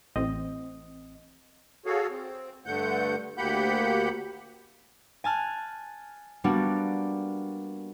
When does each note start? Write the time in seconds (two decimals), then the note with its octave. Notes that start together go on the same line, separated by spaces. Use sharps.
0.16 A1 C4 D#5
1.86 F#4 G#4 A4 C#5 F5
2.10 C4
2.66 G2 D3 A3 F#5 G6
3.38 D2 A#3 G4 F#5 B5 G6
5.24 G#5 A5 F6 F#6
6.44 G3 A#3 B3 D4 F#4